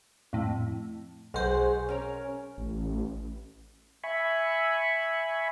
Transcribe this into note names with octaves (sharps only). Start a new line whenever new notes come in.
F2 A2
B1 G#3 F#4 G#4 C5
C#4 A#4 C#5
A1
E5 G#5 B5 C#6